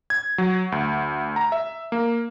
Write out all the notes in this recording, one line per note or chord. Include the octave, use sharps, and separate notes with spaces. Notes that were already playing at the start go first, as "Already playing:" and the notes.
G#6
F#3
D2
A#5
E5
A#3